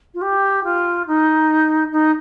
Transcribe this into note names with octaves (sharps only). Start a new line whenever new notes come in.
F4
G4
F4
D#4
D#4